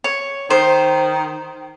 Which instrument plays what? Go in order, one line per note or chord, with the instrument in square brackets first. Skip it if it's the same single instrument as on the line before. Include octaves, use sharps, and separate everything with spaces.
[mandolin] C#5
[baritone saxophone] D#3 [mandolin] C5